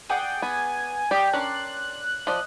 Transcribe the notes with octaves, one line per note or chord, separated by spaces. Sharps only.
G#4 D5 F#5 G5
B3 G#5
G4 D5 D#5 G6
C#4 D4 A#4 D5 C6 F#6
F3 D5 D#5